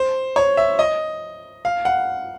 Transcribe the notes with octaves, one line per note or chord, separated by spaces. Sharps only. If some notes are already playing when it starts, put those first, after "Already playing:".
Already playing: C5
C#5
E5
D#5
F5
F#5